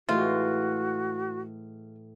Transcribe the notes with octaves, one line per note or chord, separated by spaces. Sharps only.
A2 E3 G#3 F4 F#4